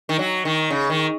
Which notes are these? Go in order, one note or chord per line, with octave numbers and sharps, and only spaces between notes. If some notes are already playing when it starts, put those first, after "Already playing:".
D#3
F#3
D#3
C#3
D#3